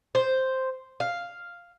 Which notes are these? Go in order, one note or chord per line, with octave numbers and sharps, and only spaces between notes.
C5
F5